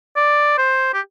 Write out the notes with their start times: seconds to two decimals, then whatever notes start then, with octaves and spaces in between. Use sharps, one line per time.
0.16 D5
0.58 C5
0.94 G4